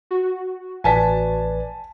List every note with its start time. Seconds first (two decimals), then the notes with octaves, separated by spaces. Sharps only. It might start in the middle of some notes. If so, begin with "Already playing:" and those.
0.11 F#4
0.84 A1 B4 D5 G#5 A5 B6